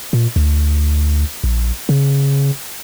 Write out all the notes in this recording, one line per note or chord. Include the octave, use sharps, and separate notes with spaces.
A#2
D2
A#1
C#3